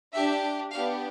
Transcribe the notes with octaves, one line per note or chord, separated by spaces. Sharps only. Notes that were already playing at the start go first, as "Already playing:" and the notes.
D4 G4 E5
B3 D4 G4 F5